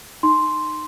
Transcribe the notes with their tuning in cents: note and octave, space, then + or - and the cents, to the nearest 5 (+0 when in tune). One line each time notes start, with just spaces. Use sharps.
D#4 -10 C6 +0